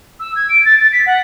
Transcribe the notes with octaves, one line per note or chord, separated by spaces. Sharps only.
E6
G#6
D7
A6
A6
B6
F#5